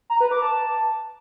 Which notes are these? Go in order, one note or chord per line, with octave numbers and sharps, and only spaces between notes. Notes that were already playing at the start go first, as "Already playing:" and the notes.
A#5
B4
D6
A5